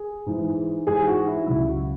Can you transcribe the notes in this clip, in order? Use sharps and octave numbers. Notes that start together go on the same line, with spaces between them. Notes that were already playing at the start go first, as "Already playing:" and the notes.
Already playing: G#4
G#2 E3
G#2 E3 G#4
F#4
E4
C#2 C#3 F#3 E4
F#4